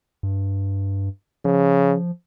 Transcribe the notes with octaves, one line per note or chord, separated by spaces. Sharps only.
G2
C#3 F3